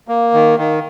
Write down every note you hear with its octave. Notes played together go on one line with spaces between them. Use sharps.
A#3
D#3
D#3